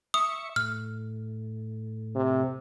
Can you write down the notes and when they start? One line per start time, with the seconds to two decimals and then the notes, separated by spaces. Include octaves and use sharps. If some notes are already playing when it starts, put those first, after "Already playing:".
0.14 E5 C#6 D#6
0.56 A2 F6
2.15 C3